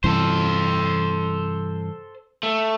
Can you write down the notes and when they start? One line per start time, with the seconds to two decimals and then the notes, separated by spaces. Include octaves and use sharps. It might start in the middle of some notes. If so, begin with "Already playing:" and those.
0.04 G2 C3 E3 A4 C5
2.43 A3